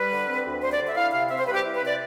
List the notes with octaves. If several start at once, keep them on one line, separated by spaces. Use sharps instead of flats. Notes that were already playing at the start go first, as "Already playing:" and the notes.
Already playing: G3 B4
D3
C4
D2
G3 C5
D5
D3
E5
E4 F5
C3 F5
C4 E5
C5
G3 B4
G4
E4
B4
C3
D5